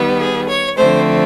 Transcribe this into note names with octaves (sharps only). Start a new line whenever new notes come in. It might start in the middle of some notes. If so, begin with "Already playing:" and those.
Already playing: D#3 G3 B3
G#4
C#5
D3 F3 A3 C4 C5